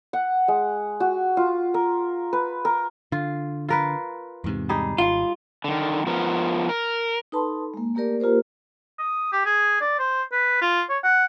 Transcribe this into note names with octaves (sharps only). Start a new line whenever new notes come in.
F#5
G#3
F#4
F4
A#4
B4
A#4
D3 F4
F4 A#4 B4
E2 G#2 C3
G3 D#4 G#4
G#1 F4
D3 D#3
F3 B3 A#4
A#4
D#4 A4 B4 A5 B5 C6
G#3 A#3
A3 A#3 G4 A#4 D5
A#3 F4 G4 A#4 C5
D#6
G4
G#4
D5
C5
B4
F4
C#5
F#5